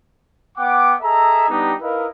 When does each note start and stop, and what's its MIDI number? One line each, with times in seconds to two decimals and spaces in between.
0.58 0.94 59
0.58 0.94 78
0.58 0.94 79
0.58 0.94 86
1.02 1.48 68
1.02 1.48 69
1.02 1.48 75
1.02 1.48 76
1.02 1.48 82
1.49 1.73 55
1.49 1.73 59
1.49 1.73 62
1.49 1.73 63
1.49 1.73 67
1.80 2.06 63
1.80 2.06 64
1.80 2.06 70
1.80 2.06 71
1.80 2.06 75
1.80 2.06 77